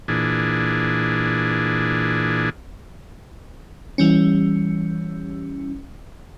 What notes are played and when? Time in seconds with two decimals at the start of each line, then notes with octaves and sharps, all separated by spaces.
0.08 A#2 E3 D4 G#4
3.98 E3 G3 C#4